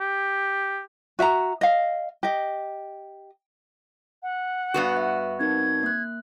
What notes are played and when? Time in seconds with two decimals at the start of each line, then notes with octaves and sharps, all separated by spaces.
0.01 G4
1.19 F#4 E5 F#5 A#5
1.61 D#5 F5
2.23 G4 D#5
4.23 F#5
4.74 G2 B3 F#4
4.97 E5
5.40 C4 D#4 A#4 G#6
5.83 A#3 F#6